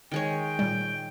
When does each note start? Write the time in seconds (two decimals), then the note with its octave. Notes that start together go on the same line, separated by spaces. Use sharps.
0.12 D#3 G#3 C#5 G5
0.59 A#2 G3